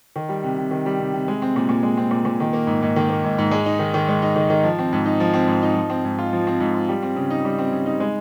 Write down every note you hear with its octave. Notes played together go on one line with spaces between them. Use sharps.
D#3
G3
C3
C3
D#3
G3
C3
C3
G#3
C4
A#2
A#2
G#3
C4
A#2
A#2
D#3
A#3
G#2
G#2
D#3
A#3
G#2
G#2
G#3
D#4
D#3
D#3
G#3
D#4
D#3
D#3
F3
C4
G#2
D#4
F3
C4
G#2
D#4
F3
C4
G#2
F4
F3
C4
G#2
F4
G3
C4
C#3
D#4
G3
C4
C#3
D#4
G#3